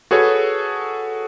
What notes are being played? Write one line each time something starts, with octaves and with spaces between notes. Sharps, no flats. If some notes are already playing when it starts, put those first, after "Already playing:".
F#4 G#4 A4 B4 C#5